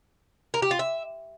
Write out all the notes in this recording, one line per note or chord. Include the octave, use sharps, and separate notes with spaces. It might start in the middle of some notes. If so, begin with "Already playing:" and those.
A#4
G4
F4
E5